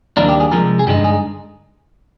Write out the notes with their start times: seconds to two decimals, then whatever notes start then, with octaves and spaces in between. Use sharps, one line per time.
0.17 D#2 D#3 G3 A#3 D4 A#4
0.29 G4
0.40 G#4
0.52 C3 F3 G#3 A#4
0.79 G#4
0.87 G2 D3 G#3 D#4 G4
1.04 G#4